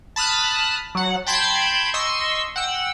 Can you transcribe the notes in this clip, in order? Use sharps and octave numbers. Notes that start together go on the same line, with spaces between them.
A5 B5 D#6 F6 F#6
F#3 F#5
G5 A5 B5 C6 G6 G#6
D#5 C6 C#6 E6
F#5 G5 E6